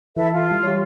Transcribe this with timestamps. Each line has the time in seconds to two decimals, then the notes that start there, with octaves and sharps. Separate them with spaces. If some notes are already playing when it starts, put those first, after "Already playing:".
0.17 E3 A4 B4 E5
0.32 F4
0.51 G3
0.63 G4 C#5